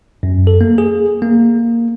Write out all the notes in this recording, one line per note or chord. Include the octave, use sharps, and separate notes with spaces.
F#2
A4
A#3
G#4
A#3